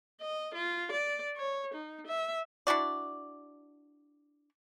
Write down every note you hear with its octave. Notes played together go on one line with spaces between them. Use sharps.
D#5
F4
D5
C#5
D#4
E5
D4 E4 F#4 D5